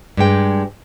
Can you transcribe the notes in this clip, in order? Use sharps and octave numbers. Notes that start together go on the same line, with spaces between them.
G2 G#3 G5